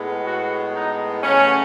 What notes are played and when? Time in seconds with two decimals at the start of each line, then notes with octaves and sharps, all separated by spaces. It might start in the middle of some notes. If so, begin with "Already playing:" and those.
Already playing: A2 G#3 B3
0.25 F#4
0.74 D#4
1.23 C#3 F#3 A3 C#4